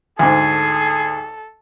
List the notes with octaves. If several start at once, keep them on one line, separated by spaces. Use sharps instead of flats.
D2 G#2 G#4 A4